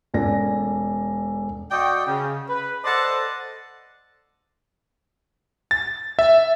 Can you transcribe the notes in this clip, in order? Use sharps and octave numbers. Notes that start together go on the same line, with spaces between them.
E1 C#4 A4 D5 A#6
F#4 D5 D#5 G5
C#3
B4
A4 C5 D5 D#5 F#5 A5
A6
E5